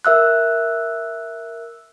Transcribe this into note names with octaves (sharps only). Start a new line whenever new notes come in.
A#4 E5 E6 F#6